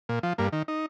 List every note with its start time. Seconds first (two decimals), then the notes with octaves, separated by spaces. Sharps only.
0.09 A#2
0.23 F3
0.38 G2 A#3
0.53 D#3
0.68 D#4